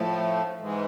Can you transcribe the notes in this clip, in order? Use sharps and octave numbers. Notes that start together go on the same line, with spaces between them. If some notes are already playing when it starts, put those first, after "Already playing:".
Already playing: A2 F3 A3
G#2 E3 G#3